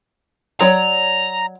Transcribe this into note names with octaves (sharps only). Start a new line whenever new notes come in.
F#3 C#5 D5 A#5